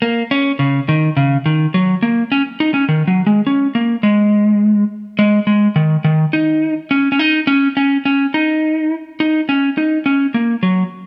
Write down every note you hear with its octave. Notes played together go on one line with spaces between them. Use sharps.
A#3
C#4
C#3
D#3
C#3
D#3
F#3
A#3
C#4
D#4
C#4
D#3
F#3
G#3
C#4
A#3
G#3
G#3
G#3
D#3
D#3
D#4
C#4
C#4
D#4
C#4
C#4
C#4
D#4
D#4
C#4
D#4
C#4
A#3
F#3